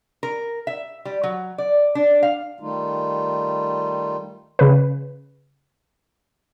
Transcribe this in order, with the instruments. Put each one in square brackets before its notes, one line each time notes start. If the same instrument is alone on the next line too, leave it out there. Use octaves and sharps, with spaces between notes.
[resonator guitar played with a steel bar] A#4
E5
G3
F#3
D5
D4
F5
[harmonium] D#3 G3 A3 D#4 F4
[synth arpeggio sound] C#3 B4